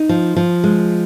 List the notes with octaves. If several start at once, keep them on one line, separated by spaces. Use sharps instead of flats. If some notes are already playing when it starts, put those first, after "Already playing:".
Already playing: D#4
F3
F3
G#3